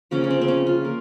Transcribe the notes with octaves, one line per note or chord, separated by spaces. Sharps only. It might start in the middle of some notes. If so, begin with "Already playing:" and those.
C#3 F3 A#3 C#4
C#4
C4
C4
C#4
F4
A#3